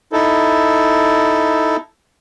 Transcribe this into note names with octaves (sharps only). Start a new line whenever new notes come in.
D#4 E4 A4